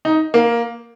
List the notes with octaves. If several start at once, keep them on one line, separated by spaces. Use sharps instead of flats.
D#4
A#3